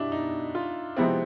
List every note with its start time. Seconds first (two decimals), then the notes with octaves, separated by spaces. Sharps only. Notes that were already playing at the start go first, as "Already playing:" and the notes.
Already playing: B2 G3 D4 E4
0.12 D#4
0.55 F4
0.97 C3 F3 G#3 B3 C4 E4